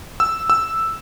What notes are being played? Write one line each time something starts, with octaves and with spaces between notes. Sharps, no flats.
E6
E6